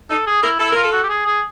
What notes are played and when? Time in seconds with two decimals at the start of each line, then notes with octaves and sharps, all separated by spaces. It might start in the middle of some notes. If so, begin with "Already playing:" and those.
0.10 D#4 A4
0.27 G#4
0.43 E4 A#4
0.59 E4 A4
0.71 F4 A#4
0.83 A4
0.92 F#4
1.03 G4
1.09 G#4
1.26 G#4